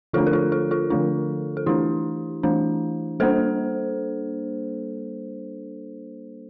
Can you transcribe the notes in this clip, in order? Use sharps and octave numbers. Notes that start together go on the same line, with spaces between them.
D3 F3 A3 D4 F4 A4
A#4
F4 A4
F4 A4
F4 A4
D3 F3 A3 D4 F4
A4
E3 A3 D4 E4 G4
E3 A3 D4
G3 A#3 D4 A4 C5